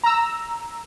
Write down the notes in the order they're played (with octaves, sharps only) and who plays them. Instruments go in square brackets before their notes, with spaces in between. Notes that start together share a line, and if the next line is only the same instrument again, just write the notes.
[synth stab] A#5 E6